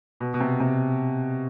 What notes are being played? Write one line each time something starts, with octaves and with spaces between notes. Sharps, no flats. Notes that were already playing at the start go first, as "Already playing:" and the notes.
B2
B2
C3
C3